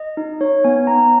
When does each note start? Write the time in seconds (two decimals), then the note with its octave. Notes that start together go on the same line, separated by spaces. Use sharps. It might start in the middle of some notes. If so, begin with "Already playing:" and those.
Already playing: D#5
0.17 D#4
0.41 D#4 C#5
0.64 B3 G#5
0.87 B3 A#5